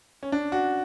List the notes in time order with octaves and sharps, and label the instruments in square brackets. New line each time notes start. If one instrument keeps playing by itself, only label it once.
[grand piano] C#4
D4
F#4